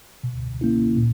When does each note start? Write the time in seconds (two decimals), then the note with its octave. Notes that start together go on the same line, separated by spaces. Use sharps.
0.24 B2
0.61 A#3 C#4 E4
0.97 A#2